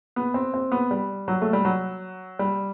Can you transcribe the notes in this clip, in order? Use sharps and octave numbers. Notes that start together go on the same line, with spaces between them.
B3
C4
C4
B3
G3
F#3
A3
G3
F#3
G3